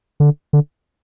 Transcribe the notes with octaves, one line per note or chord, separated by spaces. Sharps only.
D3
D3